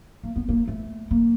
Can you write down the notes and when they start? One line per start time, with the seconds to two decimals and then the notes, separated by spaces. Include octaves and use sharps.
0.23 A#3
0.36 B3
0.49 A#3
0.68 A3
1.11 A#3